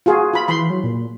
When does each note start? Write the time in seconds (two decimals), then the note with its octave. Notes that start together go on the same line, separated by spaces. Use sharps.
0.06 F4 F#4 G#4
0.33 F4 B5
0.48 E3 B5 C6
0.70 F#3
0.84 A#2